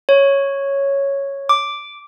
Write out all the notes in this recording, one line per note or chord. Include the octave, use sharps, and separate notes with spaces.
C#5
D6